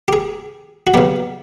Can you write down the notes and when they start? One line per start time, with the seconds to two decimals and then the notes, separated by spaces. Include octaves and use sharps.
0.08 G4
0.13 G#4
0.87 F#4
0.94 C#3 F#3 B3 G4